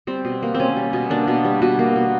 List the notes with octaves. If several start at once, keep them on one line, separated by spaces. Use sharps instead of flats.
G3 C4
B2
A#3
C4
B2 C#4
G3
B2
A#3 D4
B2
G3
B2 F#4
A#3
B2